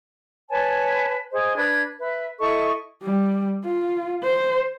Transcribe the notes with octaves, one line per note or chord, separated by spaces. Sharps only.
B4 C#5 G#5 A5
G#4 C5 D#5
D4 B4 G#6
B4 E5
E4 A4 D#5 C#6
G3
F4
C5